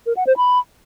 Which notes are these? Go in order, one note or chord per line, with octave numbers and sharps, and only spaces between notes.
A#4
F#5
C5
B5